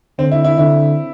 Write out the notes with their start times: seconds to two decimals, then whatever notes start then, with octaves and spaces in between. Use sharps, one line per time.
0.19 D3 C4
0.32 E4
0.44 E4
0.58 D3 E4